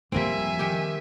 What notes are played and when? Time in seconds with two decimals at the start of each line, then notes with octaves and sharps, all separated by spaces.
0.12 F2 F3 G3 A#3 C4 E5 G#5
0.59 D#3 G4